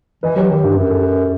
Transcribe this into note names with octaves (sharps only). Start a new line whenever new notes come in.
E3 B4 D#5
F#3 G4 B4
D#3 G4
G2 G4
F#2 G4
A4